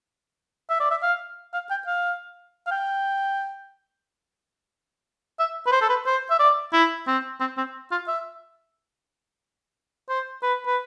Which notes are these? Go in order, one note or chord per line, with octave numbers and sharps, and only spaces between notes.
E5
D5
E5
F5
F5
G5
F5
F5
G5
E5
B4
C5
A4
B4
C5
E5
D5
E4
C4
C4
C4
F4
E5
C5
B4
B4